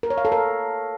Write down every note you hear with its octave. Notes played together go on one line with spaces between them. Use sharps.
A#4
C#5
F5
A4
A#4